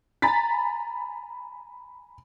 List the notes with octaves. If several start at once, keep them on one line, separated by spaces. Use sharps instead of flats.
G#5 A#5 B5 A6 B6